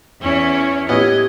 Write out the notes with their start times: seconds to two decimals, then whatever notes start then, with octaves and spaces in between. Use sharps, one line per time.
0.22 E2 C#4 E4 C#5
0.89 A2 B3 C#4 E4 G4 D#5 G#6